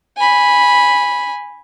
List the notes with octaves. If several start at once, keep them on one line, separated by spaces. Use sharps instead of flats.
G#5 B5